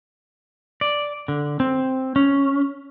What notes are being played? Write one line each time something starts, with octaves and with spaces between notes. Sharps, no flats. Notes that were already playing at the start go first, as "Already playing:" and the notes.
D5
D3
C4
C#4